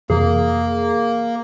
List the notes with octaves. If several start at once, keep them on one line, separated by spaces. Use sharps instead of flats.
F2 C3 E3 A#3 G#4